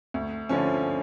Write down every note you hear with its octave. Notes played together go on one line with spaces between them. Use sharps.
D2
D3 F3 C#4